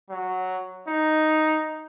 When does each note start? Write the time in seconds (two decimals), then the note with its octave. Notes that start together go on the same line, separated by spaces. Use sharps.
0.10 F#3
0.88 D#4